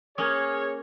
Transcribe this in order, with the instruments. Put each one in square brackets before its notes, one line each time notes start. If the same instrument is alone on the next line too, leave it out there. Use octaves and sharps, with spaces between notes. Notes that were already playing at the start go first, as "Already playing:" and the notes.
[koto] A#3 C#4 [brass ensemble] G#4 C#5 [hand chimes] D#6 F6 G#6